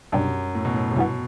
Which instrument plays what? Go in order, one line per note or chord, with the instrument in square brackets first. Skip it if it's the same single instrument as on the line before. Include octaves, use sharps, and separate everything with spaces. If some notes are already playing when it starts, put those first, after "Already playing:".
[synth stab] C2 B2 G3 D4 [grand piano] F#2
[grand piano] A2
B2
A2
C3
[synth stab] G2 E3 B3 [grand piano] B2